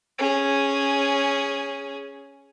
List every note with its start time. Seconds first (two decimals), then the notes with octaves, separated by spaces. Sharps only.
0.18 C#4 G#4